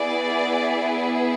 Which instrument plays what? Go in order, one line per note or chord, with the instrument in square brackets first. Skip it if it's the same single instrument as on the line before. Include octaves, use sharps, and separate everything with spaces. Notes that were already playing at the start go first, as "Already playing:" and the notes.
Already playing: [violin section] B3 E4 G#4 D5